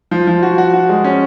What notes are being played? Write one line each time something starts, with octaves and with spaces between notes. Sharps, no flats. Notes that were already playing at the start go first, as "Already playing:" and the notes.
F3
F3
F#4
F#4
F#4
G#3
C#4